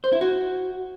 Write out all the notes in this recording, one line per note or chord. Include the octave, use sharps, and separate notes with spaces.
C5
E4
F#4